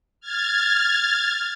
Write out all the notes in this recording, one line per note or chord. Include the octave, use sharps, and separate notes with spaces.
F6 G#6 A6